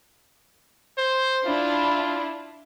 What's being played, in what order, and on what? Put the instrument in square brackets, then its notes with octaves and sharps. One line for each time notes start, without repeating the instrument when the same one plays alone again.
[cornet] C5
[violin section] D4 E4 [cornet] F4